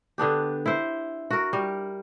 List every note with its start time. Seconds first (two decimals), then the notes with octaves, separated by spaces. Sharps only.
0.18 D3 B3 D4 G4
0.66 E4 C5
1.30 F#4 A#4
1.53 G3